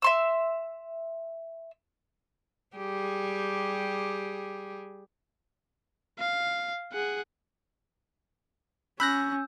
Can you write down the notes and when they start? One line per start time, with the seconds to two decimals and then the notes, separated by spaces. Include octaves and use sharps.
0.02 E5 C6 E6
2.77 G3 G4 G#4
6.19 F5
6.92 G#4 F#5
9.00 C#4 B5 E6 F#6 G6 A#6